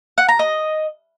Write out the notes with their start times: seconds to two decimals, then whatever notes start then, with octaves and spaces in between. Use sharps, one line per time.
0.18 F#5
0.28 A#5
0.39 D#5